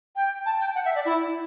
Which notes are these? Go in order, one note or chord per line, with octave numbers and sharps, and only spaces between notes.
G5
A5
G5
F#5
E5
D5
E4